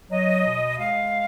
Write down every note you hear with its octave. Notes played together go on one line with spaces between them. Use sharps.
F#3 D#5
B2
G#3 F5